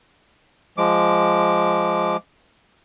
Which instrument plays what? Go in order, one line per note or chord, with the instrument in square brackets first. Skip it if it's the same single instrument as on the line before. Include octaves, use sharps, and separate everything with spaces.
[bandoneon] F3 G#3 D6